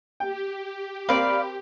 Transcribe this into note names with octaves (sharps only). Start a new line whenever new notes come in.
G4 G5
C4 A#4 C5 D5 F5 B5